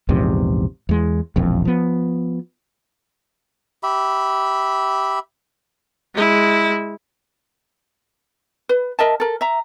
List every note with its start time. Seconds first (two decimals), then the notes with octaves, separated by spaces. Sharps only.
0.09 A#1 E2 G#2 C3
0.89 E2 G#3
1.36 E1 A#1 F2
1.65 F3 B3
3.83 G4 E5 B5
6.14 G#3 E4
8.69 B4
8.99 A#4 D#5 E5 A5
9.20 A4 A#4
9.41 E5 A#5